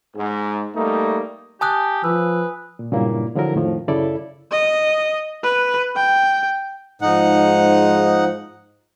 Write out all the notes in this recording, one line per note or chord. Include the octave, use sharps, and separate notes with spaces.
G#2
G3 A3 A#3 D#4
G4 G#5 A5 D#6 F#6
F3 B4 E6
A#2
G2 A#2 C#3 F#3 A#3 E4
D3 F3 F#3 E4 A#4
F2 A2 D#3 F3
F#2 C#3 E4 A4 D5
D#5
B4
G5
G#2 F3 D#4 F#5